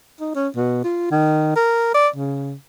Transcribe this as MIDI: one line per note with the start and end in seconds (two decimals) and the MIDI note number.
0.20 0.30 63
0.35 0.48 61
0.56 0.80 47
0.84 1.09 65
1.11 1.51 51
1.56 1.89 70
1.94 2.08 74
2.16 2.53 49